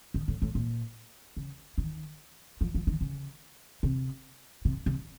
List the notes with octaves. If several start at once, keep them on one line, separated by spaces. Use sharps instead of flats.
D#3
A2
A2
A#2
C#3
D#3
F3
F3
D#3
C#3
C3
C3
C3